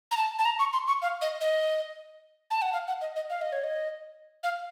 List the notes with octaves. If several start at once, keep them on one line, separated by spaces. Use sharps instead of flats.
A#5
A5
A5
A#5
C#6
C6
C#6
F5
D#5
D#5
A5
F#5
F5
F#5
D#5
D#5
F5
D#5
C#5
D#5
F5